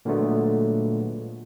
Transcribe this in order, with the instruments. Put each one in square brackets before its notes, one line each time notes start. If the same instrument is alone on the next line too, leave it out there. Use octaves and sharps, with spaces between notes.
[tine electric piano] A#2 D3 F#3 G#3 A3 B3